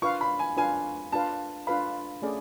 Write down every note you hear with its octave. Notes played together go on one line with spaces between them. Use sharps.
D4 F4 B4 F5 C#6
B5
G#5
D4 F4 B4 F5 G#5
D4 F4 B4 F5 A5
D4 F4 B4 F5 B5
A3 C#4 G#4 D5